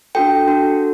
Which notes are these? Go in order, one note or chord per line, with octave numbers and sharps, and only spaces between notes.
D4 F#4 A4 G5
D4 F#4 A4